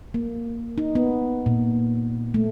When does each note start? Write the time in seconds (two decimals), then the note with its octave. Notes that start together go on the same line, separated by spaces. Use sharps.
0.14 A#3
0.78 D#4
0.95 B3
1.46 A#2
2.34 A3